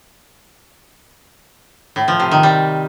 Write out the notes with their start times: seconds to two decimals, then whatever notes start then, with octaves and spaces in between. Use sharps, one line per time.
1.96 A2
2.08 F3
2.20 C3
2.31 D#3
2.43 G3